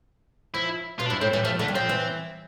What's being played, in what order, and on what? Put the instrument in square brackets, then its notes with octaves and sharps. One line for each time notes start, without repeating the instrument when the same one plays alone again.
[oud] F3 [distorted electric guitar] E4
[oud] B2 [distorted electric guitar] F4
[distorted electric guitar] D4
[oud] G2 [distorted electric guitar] E4
[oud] A2 [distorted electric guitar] C4
[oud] E3 [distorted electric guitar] G3
[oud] F3 [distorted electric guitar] A3
[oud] D3 [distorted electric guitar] A3
[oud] G3
[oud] F3 [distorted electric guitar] C4
[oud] E3